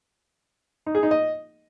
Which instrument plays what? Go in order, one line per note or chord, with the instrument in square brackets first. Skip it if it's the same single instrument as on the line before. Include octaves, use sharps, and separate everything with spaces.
[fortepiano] D#4
G#4
D#4
D#5